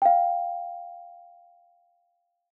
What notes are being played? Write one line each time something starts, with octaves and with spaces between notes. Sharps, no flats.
F5 G5